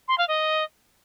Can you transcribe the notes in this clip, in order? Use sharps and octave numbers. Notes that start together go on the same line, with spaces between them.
C6
F5
D#5